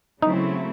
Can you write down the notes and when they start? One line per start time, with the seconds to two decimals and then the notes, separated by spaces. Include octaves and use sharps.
0.22 C#3 F#3 A3 C4 D#4 E4